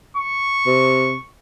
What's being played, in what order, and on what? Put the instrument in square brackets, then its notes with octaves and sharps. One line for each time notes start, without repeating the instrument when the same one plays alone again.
[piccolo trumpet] C#6
[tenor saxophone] C3